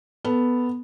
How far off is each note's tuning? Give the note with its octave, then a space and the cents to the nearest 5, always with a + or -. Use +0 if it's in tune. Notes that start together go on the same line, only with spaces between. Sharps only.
B3 +0 A4 +0